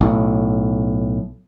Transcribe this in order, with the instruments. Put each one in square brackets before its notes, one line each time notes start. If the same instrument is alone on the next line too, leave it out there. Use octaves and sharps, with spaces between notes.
[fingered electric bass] B1 A2